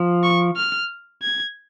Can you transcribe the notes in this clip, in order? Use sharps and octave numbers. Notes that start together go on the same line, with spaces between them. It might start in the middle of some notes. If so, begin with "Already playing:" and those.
Already playing: F3
C#6
F6
G#6